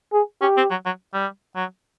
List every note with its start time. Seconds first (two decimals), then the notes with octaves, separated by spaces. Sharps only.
0.13 G#4
0.41 C#4 G4
0.57 C4
0.70 F#3
0.85 F#3
1.13 G3
1.56 F#3